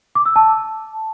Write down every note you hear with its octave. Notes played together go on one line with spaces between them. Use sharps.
D6
E6
A5